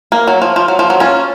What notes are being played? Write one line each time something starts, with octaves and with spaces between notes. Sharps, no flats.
A#3
F#3
F3
F3
F#3
F3
F#3
C#4 F4